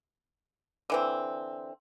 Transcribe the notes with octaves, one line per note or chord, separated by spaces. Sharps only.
D3 E3 C4